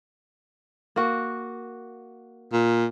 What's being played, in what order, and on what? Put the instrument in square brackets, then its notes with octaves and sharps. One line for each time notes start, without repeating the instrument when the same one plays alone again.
[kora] A#3 F#4
[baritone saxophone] A#2